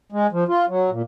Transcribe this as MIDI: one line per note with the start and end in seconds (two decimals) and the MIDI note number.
0.12 0.27 56
0.32 0.44 53
0.48 0.65 65
0.68 0.90 54
0.90 1.02 46